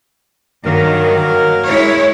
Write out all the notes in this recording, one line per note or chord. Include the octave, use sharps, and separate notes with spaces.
G2 D#3 F#3 A#3 A#4
G#3 E4 C#5